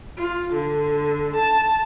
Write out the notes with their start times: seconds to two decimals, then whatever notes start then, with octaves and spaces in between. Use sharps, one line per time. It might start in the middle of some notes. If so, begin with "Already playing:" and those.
0.18 F4
0.53 D3
1.35 A5